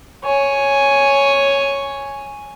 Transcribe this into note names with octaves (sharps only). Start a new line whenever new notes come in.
C#5 G#5